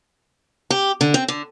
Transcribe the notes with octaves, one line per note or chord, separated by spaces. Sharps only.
G4
D3
C4
D3